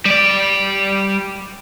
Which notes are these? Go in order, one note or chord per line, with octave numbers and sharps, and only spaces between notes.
G3 D5